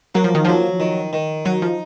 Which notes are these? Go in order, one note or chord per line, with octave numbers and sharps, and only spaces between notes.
F#3 A#3
F3
D#3
F3 F#3
D#3
D#3
F#3 D#4
F3